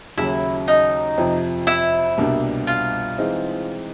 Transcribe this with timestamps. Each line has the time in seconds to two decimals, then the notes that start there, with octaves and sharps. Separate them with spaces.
0.18 D#2 C#3 F#3 E4
0.68 D#4
1.18 F2 C3 F3
1.67 E4
2.18 C2 B2 G3 A#3 D4
2.67 F4
3.18 E3 G#3 C4 D#4